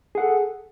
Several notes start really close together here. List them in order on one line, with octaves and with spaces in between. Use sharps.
G#4 F#5 A4